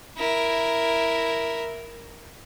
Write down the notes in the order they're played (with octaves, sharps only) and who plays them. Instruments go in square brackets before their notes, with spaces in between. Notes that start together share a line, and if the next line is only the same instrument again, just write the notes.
[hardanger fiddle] E4 A#4